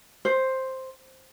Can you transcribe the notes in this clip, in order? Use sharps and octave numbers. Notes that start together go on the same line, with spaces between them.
C5